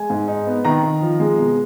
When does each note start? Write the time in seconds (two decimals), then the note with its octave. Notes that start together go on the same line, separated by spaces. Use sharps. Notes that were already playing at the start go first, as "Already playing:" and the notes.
Already playing: G#3 G#5
0.10 G#2
0.28 D#4
0.47 B3
0.65 D#3 A#5
0.83 D#3
1.01 F3
1.20 G#3
1.38 B2